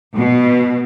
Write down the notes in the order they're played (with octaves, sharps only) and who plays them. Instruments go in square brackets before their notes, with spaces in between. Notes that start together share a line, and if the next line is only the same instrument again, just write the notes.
[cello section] B2